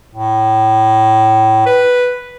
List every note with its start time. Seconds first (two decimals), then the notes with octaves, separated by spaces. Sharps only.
0.15 A2
1.66 B4